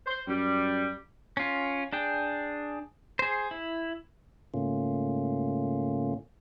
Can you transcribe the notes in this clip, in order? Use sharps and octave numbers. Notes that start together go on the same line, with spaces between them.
C5
F#2 G3
C#4 F4
D4 G#4 G5
G#4 C5
E4
G#2 C#3 A3 A#3 C#4 F4